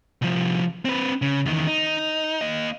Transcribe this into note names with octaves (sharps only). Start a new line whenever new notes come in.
C2 F3
C4 B4
C#3
E2 D#3
D#4
A#3 D#5